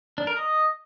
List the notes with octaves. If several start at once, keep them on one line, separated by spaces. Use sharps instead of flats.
D4
A#4
D#5